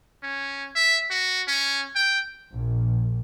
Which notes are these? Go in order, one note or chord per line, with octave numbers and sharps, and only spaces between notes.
C#4
E5
F#4
C#4
G5
A#1